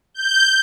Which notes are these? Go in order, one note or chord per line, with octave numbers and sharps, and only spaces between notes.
G6